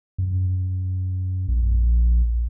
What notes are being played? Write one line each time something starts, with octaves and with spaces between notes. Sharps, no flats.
F#2
A#1